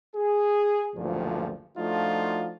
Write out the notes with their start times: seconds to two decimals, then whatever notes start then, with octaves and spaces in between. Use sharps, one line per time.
0.16 G#4
0.95 F#1 D2 G2 A#2 F3
1.77 F3 A3 D4 D#4 F4 F#4